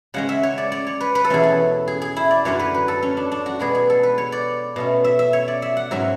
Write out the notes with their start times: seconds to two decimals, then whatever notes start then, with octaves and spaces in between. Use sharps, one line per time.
0.14 C#3 G#3 C#4 F#5
0.29 E5
0.43 C#5
0.58 D5
0.72 D5
0.87 C#5
1.01 B4
1.15 B4
1.24 A4
1.30 E2 B2 A3 C#4 G#4
1.43 A4
1.88 G#4
2.02 G#4
2.16 E4
2.31 D5
2.45 F#2 D3 F#3 C#4 C#5
2.59 B4
2.74 B4
2.88 A4
3.03 C#4
3.17 D4
3.32 D4
3.46 F#4
3.60 B2 G#3 B3 G#4
3.75 G#4
3.90 A4
4.03 B4
4.18 C#5
4.32 D5
4.76 B2 A3 C#4
5.04 E5
5.19 E5
5.33 C#5
5.48 D5
5.62 E5
5.77 F#5
5.91 G#2 F#3 C#4 E5